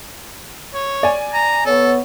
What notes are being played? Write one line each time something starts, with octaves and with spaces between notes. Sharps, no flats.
C#5
D5 G#5
A#5
B3 A4 C#5